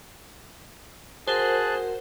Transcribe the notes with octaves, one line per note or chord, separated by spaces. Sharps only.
F#4 G#4 A#4 C5 F#5 A5 F#6